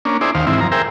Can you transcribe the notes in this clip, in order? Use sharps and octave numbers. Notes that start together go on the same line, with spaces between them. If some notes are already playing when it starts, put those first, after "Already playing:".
A#3 C#4 D4
D#4 E4 G#4 C5 D5
D#2 D#3 C5 F5
G#2 C3 E3 C4 E4
F#2 F3 A#5
G#4 A#4 C5 E5 G5